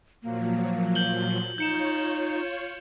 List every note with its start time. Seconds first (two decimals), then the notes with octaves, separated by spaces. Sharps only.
0.23 A#2 F3 F#3 A#3
0.95 G6 F#7 G7
1.58 D#4 F4 C#5 G6 C#7 E7